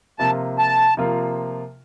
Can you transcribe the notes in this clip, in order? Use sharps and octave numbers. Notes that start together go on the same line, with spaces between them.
C3 F3 A#3 F4 A5
A5
C3 F3 A#3 F4